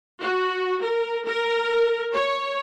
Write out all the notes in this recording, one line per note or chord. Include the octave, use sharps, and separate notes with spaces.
F#4
A#4
A#4
C#5